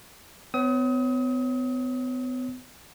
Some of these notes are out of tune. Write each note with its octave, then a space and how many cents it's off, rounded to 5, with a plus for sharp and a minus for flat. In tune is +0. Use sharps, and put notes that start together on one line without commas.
B3 +40 C#5 +0 D#6 +35